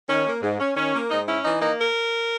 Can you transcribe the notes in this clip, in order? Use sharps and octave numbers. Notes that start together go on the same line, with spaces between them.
D#3 C#4
A#3
G#2
C#4
D#3 C#4
A#3
G#2 D#4
C#4 E4
E3 D#4
A#3 D#4
A#4